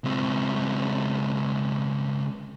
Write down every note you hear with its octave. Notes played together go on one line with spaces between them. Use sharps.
C#2 C4